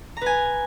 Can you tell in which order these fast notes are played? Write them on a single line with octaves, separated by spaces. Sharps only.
A#5 B4 G#5